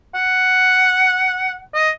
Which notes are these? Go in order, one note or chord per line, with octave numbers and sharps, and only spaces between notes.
F#5
D#5